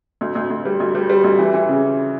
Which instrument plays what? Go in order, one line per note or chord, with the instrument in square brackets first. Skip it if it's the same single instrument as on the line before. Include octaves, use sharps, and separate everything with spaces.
[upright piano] D2
D2
D2
G3
D2
G3
G3
D2
E3
E3
C#3